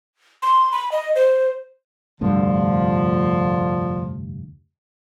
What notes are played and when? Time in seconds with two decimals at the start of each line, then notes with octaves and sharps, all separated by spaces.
0.42 C6
0.72 B5
0.92 D#5
1.16 C5
2.21 F1 D2 G2 D3 F3